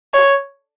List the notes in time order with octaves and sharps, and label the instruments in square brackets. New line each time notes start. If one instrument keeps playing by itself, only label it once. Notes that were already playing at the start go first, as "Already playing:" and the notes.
[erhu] C#5